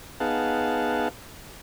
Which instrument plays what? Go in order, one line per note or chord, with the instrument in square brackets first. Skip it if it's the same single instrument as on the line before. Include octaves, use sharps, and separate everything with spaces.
[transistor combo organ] B3 D#4 G#4 F5 F#5 A5